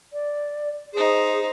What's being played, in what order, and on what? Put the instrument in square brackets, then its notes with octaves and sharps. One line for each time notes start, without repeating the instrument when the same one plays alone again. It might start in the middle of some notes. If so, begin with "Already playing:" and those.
[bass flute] D5
[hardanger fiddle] D#4 C5 [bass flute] G#4